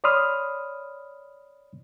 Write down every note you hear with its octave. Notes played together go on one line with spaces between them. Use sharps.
C#5 D5 B5 C6 D#6 F6